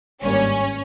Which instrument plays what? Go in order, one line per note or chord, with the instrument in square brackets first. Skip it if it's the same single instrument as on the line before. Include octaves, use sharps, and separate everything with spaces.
[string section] G#1 G2 G3 A#3 C#4 C#5